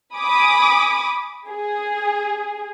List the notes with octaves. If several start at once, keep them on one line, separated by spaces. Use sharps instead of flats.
G#5 B5 D6 D#6
G#4